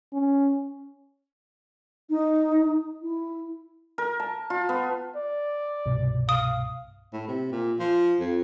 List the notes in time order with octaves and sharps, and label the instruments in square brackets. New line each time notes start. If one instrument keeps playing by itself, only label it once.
[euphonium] C#4
[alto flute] D#4
E4
[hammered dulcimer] A#4
A5
F4
B3
[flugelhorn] D5
[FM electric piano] C2 G2 B2
[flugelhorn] F5 [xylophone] D#6
[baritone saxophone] A2
C3
A#2
F3
F2